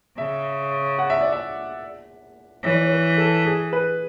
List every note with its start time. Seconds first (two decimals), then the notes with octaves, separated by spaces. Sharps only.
0.18 C#3 E5
0.99 F#5
1.10 E5
1.21 D5
1.32 E5
2.63 E3 C#5
2.72 D5
2.81 C#5
2.90 B4
3.18 A4
3.45 G#4
3.73 B4